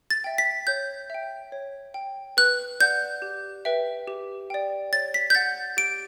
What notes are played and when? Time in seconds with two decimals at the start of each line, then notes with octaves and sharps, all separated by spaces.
0.10 A6
0.24 E5 G5
0.38 B6
0.67 C#5 G6
1.10 E5 G5
1.52 C#5
1.94 G5
2.37 B4 F#6
2.80 D5 F#5 G6
3.22 G4
3.65 B4 E5 G5
4.08 G4
4.50 D5 G5
4.93 C#5 A6
5.14 B6
5.30 G6
5.35 F#5 A6
5.77 G4 D7